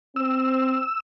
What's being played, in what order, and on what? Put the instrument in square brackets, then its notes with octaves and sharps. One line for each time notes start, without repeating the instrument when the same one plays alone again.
[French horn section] C4 [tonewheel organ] E6